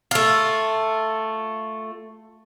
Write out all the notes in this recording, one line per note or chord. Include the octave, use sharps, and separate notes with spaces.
A3 F4